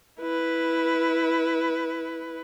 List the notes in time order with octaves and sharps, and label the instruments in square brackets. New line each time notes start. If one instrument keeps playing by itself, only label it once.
[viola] E4 B4